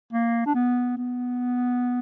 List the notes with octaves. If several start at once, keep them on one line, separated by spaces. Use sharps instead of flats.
A#3
D4
B3
B3